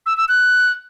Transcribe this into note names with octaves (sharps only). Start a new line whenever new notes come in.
E6
E6
F#6